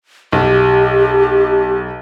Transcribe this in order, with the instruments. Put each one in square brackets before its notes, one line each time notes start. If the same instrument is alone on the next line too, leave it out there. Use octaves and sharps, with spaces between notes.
[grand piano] B1 [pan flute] G4